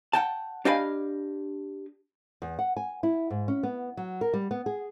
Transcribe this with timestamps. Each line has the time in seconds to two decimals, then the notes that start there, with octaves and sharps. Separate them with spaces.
0.13 F#5 G5 A5
0.65 D4 G4 D#5 F5 G#5 B5
2.42 E2
2.59 F#5
2.77 G#5
3.03 E4
3.30 G#2
3.48 C#4
3.63 B3
3.97 F#3
4.21 A#4
4.33 G3
4.51 B3
4.66 G#4